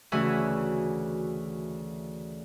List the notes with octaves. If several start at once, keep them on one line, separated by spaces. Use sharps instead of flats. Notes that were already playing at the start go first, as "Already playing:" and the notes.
D2 C#3 E3 F#4 E5 G#5